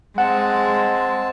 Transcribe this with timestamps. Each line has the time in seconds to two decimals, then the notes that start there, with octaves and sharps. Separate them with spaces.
0.18 G#3 C4 F#5 A5